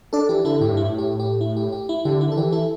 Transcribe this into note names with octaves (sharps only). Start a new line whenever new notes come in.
D4 A4 D5
E3 G4
D3 E4 A4
A2 G4
G2
E4
A2
G4
G4
E4
G4
G4
E4
D3 G4
E4
D3
A4
E3 G4
E4 A4